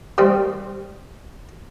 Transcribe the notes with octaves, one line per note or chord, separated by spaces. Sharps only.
D#3 G3 C4